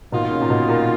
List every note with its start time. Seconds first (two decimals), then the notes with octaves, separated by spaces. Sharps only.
0.12 B2 D#3 A#3 F4
0.31 C#3
0.41 A#2
0.50 B2
0.69 A#2